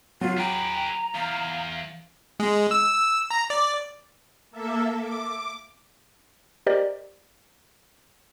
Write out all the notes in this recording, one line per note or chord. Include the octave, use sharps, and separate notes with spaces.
F#3 F4
G#4 B4 G5 A#5
E2 F5
G#3
E6
A#5
D5
A#3 A4 E5
D6
G4 A#4 C5 D5 D#5